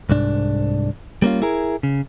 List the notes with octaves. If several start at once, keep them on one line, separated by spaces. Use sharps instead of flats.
C2 G#2 D4
G3 A#3 C#4 F4
E4 G#4 A#4
C#3